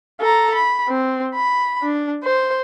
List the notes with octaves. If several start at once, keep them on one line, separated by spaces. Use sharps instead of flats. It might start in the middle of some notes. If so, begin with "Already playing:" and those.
A4 A#5
B5
C4
B5
D4
C5